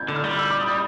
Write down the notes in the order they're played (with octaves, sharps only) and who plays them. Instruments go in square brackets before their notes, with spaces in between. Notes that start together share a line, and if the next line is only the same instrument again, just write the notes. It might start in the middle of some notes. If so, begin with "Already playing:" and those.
Already playing: [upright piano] G6 G#6
[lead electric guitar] D3
[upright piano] F6
[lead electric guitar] G3
[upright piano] E6
D6
D#6